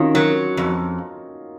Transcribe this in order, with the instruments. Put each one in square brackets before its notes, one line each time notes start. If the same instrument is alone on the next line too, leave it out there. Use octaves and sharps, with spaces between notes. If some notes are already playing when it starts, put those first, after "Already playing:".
Already playing: [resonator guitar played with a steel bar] D#3 [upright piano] C#4 D#4 F4 F#4
[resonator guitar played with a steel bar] F#3 [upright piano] F#4 A#4
[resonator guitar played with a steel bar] F2